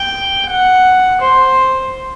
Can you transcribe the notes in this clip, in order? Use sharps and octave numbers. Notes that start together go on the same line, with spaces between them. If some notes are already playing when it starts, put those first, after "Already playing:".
Already playing: G5
F#5
C5